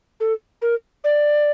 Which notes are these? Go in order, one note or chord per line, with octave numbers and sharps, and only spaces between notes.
A4
A#4
D5